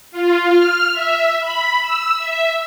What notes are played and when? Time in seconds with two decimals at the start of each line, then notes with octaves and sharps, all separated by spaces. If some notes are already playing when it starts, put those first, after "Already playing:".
0.12 F4
0.52 F6
0.93 E5
1.41 B5
1.80 E6
2.18 E5